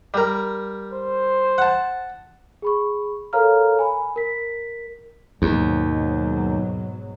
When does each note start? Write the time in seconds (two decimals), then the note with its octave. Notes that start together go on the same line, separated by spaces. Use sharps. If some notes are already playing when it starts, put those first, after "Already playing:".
0.14 G3 A#4
0.93 C5
1.58 F#5 A5
2.62 G#4 B5 C#6
3.33 A4 A#4 C#5 F5 A#5 F6
3.79 G#5 B5
4.16 A#4 B6
5.42 D#2 G#2 B2 F#3